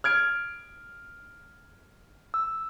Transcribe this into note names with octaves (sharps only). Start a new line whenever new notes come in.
F6 G#6 D7
E6